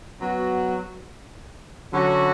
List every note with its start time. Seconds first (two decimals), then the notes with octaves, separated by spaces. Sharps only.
0.20 F#3 B3 F#4
1.92 D3 F#3 C#4 F#4